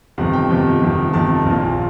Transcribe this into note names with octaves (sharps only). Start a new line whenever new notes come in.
G1 F2 C3 D#3 F#5
G5
G1 F2 C3 D#3
G1 F2 C3 D#3
G1 F2 C3 D#3 A5
A#1 A#2